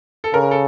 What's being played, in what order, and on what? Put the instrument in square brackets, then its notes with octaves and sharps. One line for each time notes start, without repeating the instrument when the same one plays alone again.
[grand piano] A4
[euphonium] C#3 [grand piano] A#4
[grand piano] A4